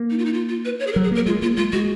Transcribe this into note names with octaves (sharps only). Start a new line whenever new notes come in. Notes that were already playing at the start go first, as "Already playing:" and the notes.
Already playing: A#3
D#4
F4
D#4
F4
F4
B4
C#5
G#4
A#4
F#3
G#4
A#3 A#4
G#3 F4
A#3 F4
G#3 F4
G#3 F#4